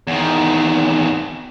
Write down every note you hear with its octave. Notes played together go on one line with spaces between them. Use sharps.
E2 D#3